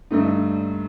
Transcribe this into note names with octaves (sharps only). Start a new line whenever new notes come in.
G2 D3 A3 D#4